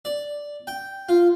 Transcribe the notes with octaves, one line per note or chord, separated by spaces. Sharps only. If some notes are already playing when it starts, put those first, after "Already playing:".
D5
G5
F4